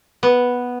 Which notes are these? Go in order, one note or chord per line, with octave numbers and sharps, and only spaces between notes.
B3